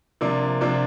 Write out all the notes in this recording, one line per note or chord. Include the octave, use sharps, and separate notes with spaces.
C3 F3 A#3 D4
C3 F3 A#3 D4